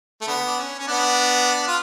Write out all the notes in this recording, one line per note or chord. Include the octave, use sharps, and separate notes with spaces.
A3
D3 B3
D4
C#4
C#4
B3 D4
F4